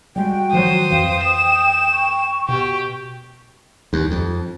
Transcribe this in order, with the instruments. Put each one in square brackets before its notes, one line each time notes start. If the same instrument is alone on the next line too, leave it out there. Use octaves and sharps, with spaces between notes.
[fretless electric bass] G3 G#3 [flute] F#4 [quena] G5
[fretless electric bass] D#3 F3 F#3 [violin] C5 D#6
[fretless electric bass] F2 E3 [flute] F5 [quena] G5
[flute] D#6 [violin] E7
[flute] C#6
[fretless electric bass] B2 [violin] G4
[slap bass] D#2
F2